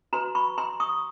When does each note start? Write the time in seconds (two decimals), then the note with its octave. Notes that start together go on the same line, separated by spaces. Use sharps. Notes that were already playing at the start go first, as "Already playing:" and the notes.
0.13 F#4 B4 A#5 C6
0.35 B5 C#6
0.58 A#5 C6
0.80 C#6 D#6